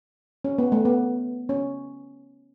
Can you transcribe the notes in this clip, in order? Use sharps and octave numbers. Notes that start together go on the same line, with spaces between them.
C#4
B3
A3
B3
C#4